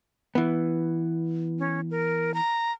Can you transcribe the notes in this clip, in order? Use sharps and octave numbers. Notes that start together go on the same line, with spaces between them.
E3 B3
C#4
A#4
A#5